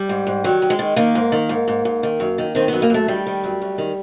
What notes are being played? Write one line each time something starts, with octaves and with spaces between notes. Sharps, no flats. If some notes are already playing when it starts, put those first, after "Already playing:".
Already playing: G3
G#2
G#2
D#3 F#3
D#3
G#3
D#3
D#3 A#3
G#2
D#3
G#2
G#2
G#2
D#3
F#2
D#3
D#3 C4
F#2 B3
A#3
F#2 A3
D#3 G3
D#3
F#2
F#2
D#3